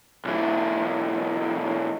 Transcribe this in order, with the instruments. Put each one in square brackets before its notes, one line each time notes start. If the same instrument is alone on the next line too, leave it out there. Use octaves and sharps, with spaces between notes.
[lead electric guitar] B1 E3